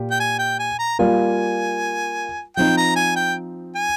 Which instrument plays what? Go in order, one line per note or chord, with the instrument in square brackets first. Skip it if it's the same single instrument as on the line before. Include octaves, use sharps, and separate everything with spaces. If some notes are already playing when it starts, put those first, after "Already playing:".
Already playing: [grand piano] A#2 G4
[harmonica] G5
G#5
G5
G#5
A#5
[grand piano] G3 A#3 F4 [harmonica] G#5
[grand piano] F3 C4 D#4 [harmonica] G5
[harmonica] A#5
G#5
G5
G#5